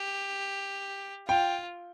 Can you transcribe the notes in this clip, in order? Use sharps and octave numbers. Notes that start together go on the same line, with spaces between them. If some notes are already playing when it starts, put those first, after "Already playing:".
Already playing: G4
F4 G5